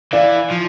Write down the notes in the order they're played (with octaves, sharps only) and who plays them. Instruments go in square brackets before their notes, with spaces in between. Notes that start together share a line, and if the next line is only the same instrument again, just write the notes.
[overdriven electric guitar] E3 [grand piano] D5 F5
[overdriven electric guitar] F3